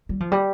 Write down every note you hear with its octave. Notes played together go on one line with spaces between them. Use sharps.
G3
F3
G3